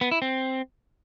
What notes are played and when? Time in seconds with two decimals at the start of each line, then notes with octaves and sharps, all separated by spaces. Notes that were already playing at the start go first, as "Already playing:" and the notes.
0.01 B3
0.11 E4
0.22 C4